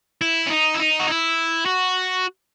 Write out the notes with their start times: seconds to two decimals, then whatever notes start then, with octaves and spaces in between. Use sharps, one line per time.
0.21 E4
0.47 C#4
0.50 D#4
0.74 E4
0.80 D#4
0.99 F#4
1.08 E4
1.65 F#4